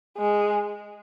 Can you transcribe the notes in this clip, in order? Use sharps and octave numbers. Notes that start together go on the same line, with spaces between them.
G#3